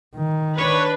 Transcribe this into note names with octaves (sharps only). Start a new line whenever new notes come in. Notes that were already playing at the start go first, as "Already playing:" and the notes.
D#3
D4 B4 C#5